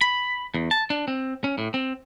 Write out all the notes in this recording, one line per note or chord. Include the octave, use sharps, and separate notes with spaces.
B5
E2
A5
D4
C4
C#4
A2
C4